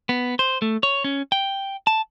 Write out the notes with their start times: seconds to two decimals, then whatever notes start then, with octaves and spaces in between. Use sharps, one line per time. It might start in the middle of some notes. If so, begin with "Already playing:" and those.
0.09 B3
0.39 C5
0.62 A3
0.83 C#5
1.04 C#4
1.32 G5
1.87 A5